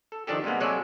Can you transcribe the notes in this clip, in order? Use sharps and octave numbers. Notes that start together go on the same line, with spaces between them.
A4
D#3 F3 D4 G4 A4
C3 G3 G#3 A#3 B3
C3 F#3 G#3 A4 C#5 D5